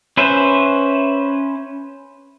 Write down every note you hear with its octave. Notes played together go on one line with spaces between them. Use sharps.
C#4 B4 C5 E5